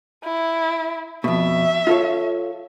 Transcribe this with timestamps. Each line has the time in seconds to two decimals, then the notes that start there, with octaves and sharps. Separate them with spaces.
0.24 E4
1.24 F2 B2 E5
1.87 F4 A4 C#5